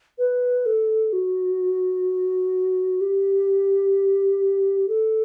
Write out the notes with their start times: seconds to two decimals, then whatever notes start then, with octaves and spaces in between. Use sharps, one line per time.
0.18 B4
0.66 A4
1.13 F#4
3.01 G4
4.88 A4